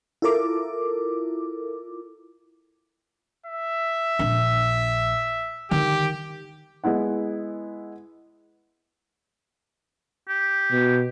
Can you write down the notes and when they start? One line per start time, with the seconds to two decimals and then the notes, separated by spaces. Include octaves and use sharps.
0.22 E4 F4 A4 A#4 D6
3.46 E5
4.19 A#1 D4
5.71 D3 D#3 G4
6.84 G#3 B3 E4 F#5
10.29 G4
10.71 B2